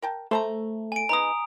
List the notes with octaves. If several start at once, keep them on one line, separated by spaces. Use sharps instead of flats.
A#4 G5 A5
A3 C5 A5 A#5
G#5 D7
G#3 B3 D#4 A#5 D#6